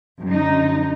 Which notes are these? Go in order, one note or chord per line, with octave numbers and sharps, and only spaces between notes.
F#2 D3 D#4